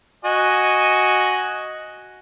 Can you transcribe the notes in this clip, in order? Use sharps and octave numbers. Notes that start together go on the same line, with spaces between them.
F#4 D#5 G#5